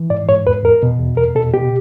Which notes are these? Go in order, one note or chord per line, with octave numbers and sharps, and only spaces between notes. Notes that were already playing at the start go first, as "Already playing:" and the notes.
Already playing: E3
G#2 D5
G#2 C#5
E2 B4
E2 A#4
B2
E2
E2 A#4
B2 A4
B2 G4